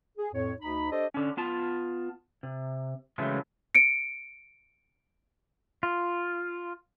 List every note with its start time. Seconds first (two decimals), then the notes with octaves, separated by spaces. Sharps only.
0.18 G#4
0.33 F2 A2 C#5
0.61 D2 D#4 B5
0.92 D4 G4 A4 C5 D5 D#5
1.14 D3 C#4
1.37 B3 F4 A5
2.43 C3
3.18 C#3 E3 F#3 G#3 A3 C4
3.75 C#7 D7
5.83 F4